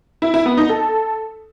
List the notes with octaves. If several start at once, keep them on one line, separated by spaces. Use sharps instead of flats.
E4
E4
B3
D#4
A4